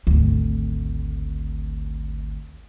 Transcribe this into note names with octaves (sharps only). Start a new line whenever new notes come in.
G#1 D2